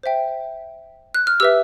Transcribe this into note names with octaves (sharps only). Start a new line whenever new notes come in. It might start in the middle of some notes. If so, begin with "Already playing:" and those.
C5 E5 G5
F#6
F6
G4 B4 E5 E6